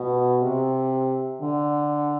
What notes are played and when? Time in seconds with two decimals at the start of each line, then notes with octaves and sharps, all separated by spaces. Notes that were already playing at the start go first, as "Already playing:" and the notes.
Already playing: B2
0.42 C3
1.41 D3